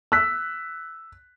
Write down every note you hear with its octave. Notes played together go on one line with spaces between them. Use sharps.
E6 F#6 B6